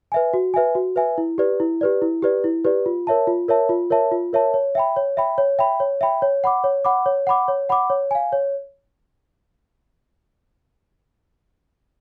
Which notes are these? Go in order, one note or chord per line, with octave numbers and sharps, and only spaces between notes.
B4 E5 G#5
F#4
B4 E5 G#5
F#4
B4 E5 G#5
E4
G4 B4 D5
E4
G4 B4 D5
E4
G4 B4 D5
E4
G4 B4 D5
F4
A#4 C#5 E5 A5
F4
A#4 C#5 E5 A5
F4
A#4 C#5 E5 A5
F4
A#4 C#5 E5 A5
C#5
E5 G5 B5
C#5
E5 G5 B5
C#5
E5 G5 B5
C#5
E5 G5 B5
C#5
F#5 B5 D6
C#5
F#5 B5 D6
C#5
F#5 B5 D6
C#5
F#5 B5 D6
C#5
F5 G#5
C#5